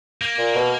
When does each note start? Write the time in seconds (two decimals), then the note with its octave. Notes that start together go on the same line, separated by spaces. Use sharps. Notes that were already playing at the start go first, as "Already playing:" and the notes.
0.21 A#3
0.39 A#2
0.55 B2